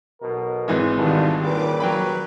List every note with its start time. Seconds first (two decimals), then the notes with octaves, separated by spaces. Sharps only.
0.21 B1 B2 A#4
0.68 G#1 E3 G#3
0.97 G2 B2 D3 D#3
1.40 A#2 C#3 G3 B4 D6
1.80 F#3 B4 G5 B5